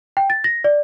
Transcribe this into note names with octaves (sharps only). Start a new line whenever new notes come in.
G5
A6
A#6
D5